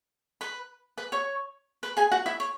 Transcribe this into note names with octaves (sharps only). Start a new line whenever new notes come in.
B4 B5
B4 B5
C#5 C#6
B4 B5
G#4 G#5
F#4 F#5
E4 E5
C#5